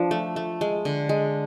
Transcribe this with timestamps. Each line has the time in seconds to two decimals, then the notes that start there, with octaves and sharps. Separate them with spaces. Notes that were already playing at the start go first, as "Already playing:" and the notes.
Already playing: F3 D4
0.11 A3
0.36 A3
0.61 G#3
0.85 D3
1.09 G#3